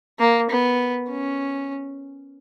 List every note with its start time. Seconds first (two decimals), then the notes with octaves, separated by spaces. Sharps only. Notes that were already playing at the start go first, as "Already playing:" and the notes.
0.19 A#3
0.50 B3
1.10 C#4